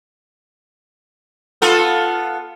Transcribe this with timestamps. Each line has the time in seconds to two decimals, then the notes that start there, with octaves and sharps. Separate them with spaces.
1.62 B3 F4 A4